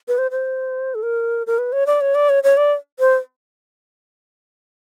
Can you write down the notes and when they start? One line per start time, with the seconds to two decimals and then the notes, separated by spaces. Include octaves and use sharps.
0.08 B4
0.18 C5
0.31 C5
0.95 A4
1.03 A#4
1.47 A#4
1.58 B4
1.72 C#5
1.87 D5
2.01 C#5
2.15 D5
2.29 C#5
2.44 C#5
2.57 D5
2.99 C5